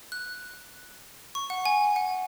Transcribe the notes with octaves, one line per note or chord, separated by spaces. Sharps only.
F#6
C#6
F#5
G#5
F#5